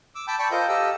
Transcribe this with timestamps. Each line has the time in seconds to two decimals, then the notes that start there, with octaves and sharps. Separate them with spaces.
0.15 D6 E6
0.28 G5 A5 B5 D6 E6 G6
0.39 D5 G5 A5 B5 C#6
0.51 F4 A4 A#4 C5 D#5 G6
0.69 G4 A4 D#5 F5 E6